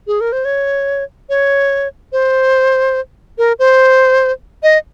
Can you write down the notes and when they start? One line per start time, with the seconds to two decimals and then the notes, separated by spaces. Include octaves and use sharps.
0.07 G#4
0.21 A#4
0.32 C5
0.45 C#5
1.29 C#5
2.12 C5
3.38 A#4
3.59 C5
4.63 D#5